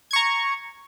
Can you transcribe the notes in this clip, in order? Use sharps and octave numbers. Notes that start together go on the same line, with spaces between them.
A#5 C#6 G#6